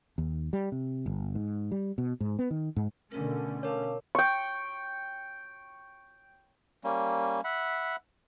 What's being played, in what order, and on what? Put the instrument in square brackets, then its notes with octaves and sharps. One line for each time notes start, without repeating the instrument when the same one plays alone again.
[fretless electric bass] D#2
G3
C3
G1
G#2
G3
B2
G#2
B3
D#3
G#2
[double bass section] B2 D3 A3 [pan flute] C#4 [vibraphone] A#4
[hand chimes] A#4 C#5 [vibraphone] F5 A5 D6
[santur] G5 C#6
[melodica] G3 A#3 C#4
E5 F#5 B5